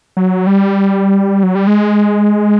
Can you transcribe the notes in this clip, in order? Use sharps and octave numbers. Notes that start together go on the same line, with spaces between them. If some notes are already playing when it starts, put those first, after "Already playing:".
F#3
G3
F#3
G3
G#3